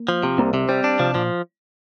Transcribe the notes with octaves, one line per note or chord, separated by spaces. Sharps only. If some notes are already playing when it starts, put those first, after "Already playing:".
Already playing: A#3
F3
C3
C2 A#3
C3 C4
G3 C4
D4
C3 F3
A#2 F3